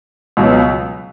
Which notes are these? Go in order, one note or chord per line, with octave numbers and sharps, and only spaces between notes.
C#2 B2 F#3